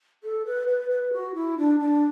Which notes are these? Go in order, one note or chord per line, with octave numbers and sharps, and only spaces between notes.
A4
B4
B4
B4
F#4
E4
D4
D4